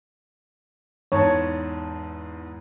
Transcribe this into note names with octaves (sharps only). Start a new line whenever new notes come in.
E2 G#2 C#5 A5